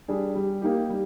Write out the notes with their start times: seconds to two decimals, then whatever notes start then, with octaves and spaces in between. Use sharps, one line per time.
0.08 G3 D4 G#4
0.35 G3
0.62 A#3 D#4 G4
0.89 G3